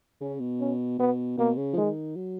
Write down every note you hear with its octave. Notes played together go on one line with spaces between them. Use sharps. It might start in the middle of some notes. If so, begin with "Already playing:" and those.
C#3 C#4
B2
C#4
B2 B3
B2 A#3
C#3
F3
D#3 G#3
F#3